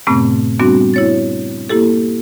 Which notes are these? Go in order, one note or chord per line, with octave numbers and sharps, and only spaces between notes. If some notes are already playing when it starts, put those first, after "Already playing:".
G2 A#2 C#3 A3 B3 C4
G3 B3 C4 D4 F#4
E4 C#5 A6
A#3 E4 G4 A4